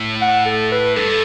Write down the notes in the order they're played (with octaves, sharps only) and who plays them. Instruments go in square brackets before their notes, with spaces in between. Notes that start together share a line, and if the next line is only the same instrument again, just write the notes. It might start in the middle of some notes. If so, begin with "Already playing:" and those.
Already playing: [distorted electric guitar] A2
[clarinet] F#5
A4
B4
[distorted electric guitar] G2 [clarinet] A4